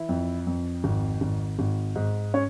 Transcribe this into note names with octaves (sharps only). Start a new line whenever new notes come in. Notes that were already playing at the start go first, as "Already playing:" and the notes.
Already playing: E3 E4
F2
F2
G#1
G#1
G#1
G#2
C#4 C#5